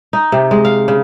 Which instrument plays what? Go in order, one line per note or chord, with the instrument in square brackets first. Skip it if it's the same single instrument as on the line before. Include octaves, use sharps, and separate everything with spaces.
[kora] D#4
C3
G#3
F5
C#3